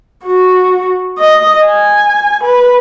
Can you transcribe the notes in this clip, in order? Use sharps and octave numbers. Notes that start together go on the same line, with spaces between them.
F#4
D#5
G#5
B4